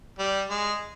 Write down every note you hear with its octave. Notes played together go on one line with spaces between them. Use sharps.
G3
G#3